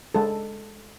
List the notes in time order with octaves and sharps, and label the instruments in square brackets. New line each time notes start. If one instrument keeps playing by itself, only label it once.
[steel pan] G#3 A4